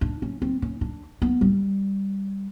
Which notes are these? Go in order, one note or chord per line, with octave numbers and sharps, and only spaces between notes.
D4
C#4
C4
C#4
D4
B3
G3